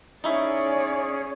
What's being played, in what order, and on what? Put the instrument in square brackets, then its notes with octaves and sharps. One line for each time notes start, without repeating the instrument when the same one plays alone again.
[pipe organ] C#4 G#4 [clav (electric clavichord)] D#4 E4 E5 [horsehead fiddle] C#5 D5